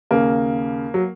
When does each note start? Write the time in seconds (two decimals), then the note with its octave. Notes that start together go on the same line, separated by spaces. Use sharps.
0.11 D#2 C#3 A#3
0.94 F#3